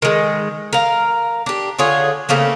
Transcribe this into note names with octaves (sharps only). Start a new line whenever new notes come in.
D#3 G#3
A#4 F5
D4 G4
D3 F4 G#4 C#5
C#3 A3 A#3 C4